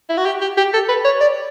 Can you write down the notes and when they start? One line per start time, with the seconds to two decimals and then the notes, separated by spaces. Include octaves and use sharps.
0.09 E4
0.17 F#4
0.26 G4
0.41 G4
0.57 G4
0.74 A4
0.89 B4
1.05 C#5
1.21 D5